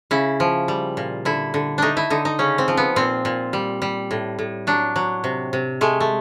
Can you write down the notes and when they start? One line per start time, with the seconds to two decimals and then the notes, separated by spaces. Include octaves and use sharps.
0.11 C#3 E4
0.40 F3
0.68 G3
0.97 A#2
1.25 D3 E4
1.54 D3
1.78 A3 D4 D#4
1.97 E4
2.10 D3 D#4
2.25 D#4
2.39 C#3 C#4
2.58 C4
2.68 F3
2.77 B3
2.96 A#2 C4
3.25 A#2
3.53 G3
3.82 G3
4.11 A2
4.39 A2
4.67 F#3 D4
4.96 F#3
5.24 C3
5.53 C3
5.81 G#3 A3
6.00 A3